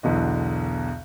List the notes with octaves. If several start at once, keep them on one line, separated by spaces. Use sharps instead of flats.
B1 E2 B2 D3 D#5